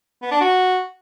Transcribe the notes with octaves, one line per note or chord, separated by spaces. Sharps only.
B3
D4
F#4